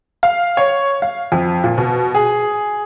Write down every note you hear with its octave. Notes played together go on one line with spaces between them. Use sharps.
F5
C#5
F5
F2
A#2
B2
G#4